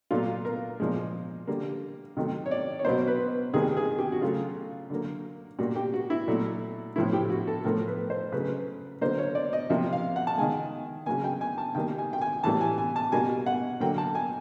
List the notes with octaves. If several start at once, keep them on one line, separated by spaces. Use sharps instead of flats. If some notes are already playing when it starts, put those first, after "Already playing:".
A#2 F#3 A3 F4
A#4
A#2 F3 G#3
D3 G3 A#3
C3 D#3 F#3 A3
C#5
D5
C#5
B2 F#3 A#3 C5
B4
C3 D#3 G3 A#3 G#4
G#4
G4
F#4
C#3 F#3 A3 F4
D3 F#3 A#3
A#2 G3 A#3 F#4
G4
F#4
E4
A#2 F#3 A3
A2 F3 A3 E4
G4
F#4
A4
A2 F3 A3 A#4
B4
C5
C#3 F#3 A3 B4
D3 F#3 A#3 C5
C#5
D5
D#5
C3 F3 A#3 E5
F5
F#5
A5
D#3 G#3 G#5
C#3 F#3 A#3 G#5
G5
G#5
A5
D#3 G3 A#3 G5
G#5
G5
G#5
A2 E3 G3 A#3 A5
G#5
G#5
A5
B2 G3 A#3 G#5
F#5
D3 F#3 A#3 G5
A5
G#5